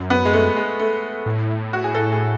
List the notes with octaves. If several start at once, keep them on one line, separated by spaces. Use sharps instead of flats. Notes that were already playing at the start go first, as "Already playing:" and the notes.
Already playing: F#2
B3
G#3
A3
G#3
A3
A2
F#4
G#4
A4
G#4